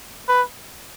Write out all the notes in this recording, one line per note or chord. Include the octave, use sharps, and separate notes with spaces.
B4